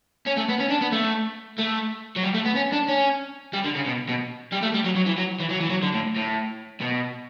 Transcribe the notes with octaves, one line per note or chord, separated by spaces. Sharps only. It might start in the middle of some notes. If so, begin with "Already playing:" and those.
C#4
A3
B3
C#4
D4
B3
A3
A3
F#3
G3
A3
B3
C#4
D4
C#4
G3
D3
C#3
B2
B2
G3
A3
G3
F#3
F#3
E3
F#3
E3
F#3
E3
F#3
D3
A2
A2
B2